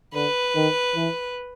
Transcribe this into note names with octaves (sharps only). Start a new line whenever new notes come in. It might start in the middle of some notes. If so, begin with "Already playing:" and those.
D3 B4
D#3
E3